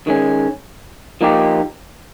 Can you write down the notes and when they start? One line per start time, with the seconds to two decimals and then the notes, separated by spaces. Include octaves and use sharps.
0.07 D#3 G#3 C#4
1.21 F3 A#3 D#4 G4